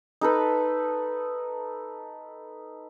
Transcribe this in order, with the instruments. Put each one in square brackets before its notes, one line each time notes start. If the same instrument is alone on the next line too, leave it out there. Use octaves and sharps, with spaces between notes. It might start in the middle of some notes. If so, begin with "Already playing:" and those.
[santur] D#4 A4 B4